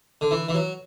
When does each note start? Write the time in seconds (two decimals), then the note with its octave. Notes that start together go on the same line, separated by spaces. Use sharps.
0.21 D3
0.31 E3
0.49 E3
0.54 F#3